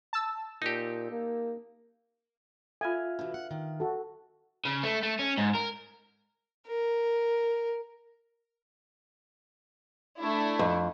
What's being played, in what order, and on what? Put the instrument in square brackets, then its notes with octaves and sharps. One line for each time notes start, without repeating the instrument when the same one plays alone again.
[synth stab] A5 E6
[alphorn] A#2 [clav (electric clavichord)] D#4 G4
[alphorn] A#3
[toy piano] F4 A4 [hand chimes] E5 F5 F6 [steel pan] G#5
[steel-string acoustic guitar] B2 E3 [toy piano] D4
[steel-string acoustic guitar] F#5
D#3
[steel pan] F#4 A4
[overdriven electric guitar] C#3
A3
A3
C#4
G#2
A#4
[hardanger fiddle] A#4
[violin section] A3 D4 E4
[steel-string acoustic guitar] F2